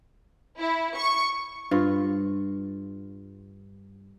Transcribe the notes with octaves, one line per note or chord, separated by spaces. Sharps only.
E4
C#6
G2 F4